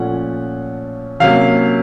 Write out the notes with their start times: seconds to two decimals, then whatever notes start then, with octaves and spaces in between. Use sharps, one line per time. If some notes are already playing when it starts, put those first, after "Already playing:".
Already playing: A#2 F3 A3 C#4 F#5
1.20 C3 F#3 A#3 C#4 F5